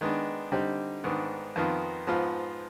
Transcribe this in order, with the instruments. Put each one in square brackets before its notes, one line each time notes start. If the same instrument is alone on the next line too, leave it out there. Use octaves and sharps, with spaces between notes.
[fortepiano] D#3 G#3 B3 D4
D3 G3 C4 D#4 G4
G#2 D#3 B3 D4
F2 D#3 B3 F4
G#2 F3 B3 F4